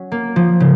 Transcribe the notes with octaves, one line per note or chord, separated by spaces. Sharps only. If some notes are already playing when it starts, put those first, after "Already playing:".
Already playing: F#3 C#4
A#3
F3
C#3